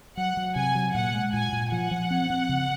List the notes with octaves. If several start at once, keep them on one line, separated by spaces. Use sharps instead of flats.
F#3 F#5
F#3
C3 G#5
F#3
A#2 F#5
G#3
A#2 G#5
A#2
F3 F#5
F3
C4
C4
C#3